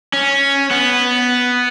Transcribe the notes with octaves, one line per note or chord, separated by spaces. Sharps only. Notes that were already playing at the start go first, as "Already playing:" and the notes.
C#4
B3